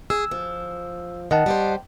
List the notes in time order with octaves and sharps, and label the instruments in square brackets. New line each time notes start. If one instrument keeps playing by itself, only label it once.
[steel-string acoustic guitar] G#4 [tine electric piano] E6
[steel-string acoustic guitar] F3
[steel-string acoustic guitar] D#3 [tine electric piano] D#5 F#5 A5
[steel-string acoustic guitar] G3 G4 C5